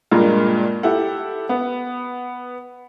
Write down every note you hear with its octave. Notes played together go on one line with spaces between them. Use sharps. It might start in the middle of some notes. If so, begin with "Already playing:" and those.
G2 A#2 G#3 A#3
E4 G4 A4 F#5
B3